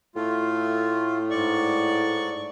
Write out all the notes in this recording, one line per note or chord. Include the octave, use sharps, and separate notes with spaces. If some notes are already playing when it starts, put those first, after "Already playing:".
A2 A3 F4
G#2 D5 C#6